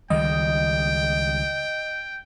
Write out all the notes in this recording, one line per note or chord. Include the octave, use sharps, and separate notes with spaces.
C#2 D#3 G3 D#5 G5